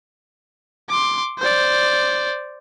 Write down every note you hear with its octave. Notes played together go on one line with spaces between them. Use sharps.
C6 D6
C5 D5